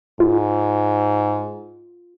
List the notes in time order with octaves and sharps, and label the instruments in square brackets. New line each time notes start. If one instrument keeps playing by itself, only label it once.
[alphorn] G#2 [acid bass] F4